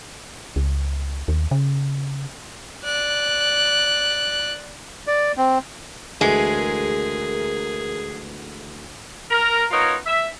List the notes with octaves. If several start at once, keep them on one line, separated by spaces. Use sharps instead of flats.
C#2
D#2
C#3
D5 F#6
D5
C4
D2 E3 G#3 G#4 A#4
A#4 A#5
B3 D#4 F4 A#4 C#5
E5